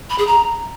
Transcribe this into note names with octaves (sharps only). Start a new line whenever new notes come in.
B5
G#4
A#5